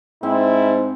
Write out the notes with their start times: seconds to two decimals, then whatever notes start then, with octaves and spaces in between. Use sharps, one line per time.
0.23 G#2 C4 E4